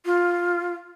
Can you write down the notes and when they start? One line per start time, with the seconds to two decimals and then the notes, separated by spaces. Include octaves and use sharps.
0.06 F4